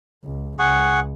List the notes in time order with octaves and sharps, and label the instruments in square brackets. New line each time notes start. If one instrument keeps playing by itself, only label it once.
[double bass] C#2
[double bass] C#2 [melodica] G#4 F#5 C#6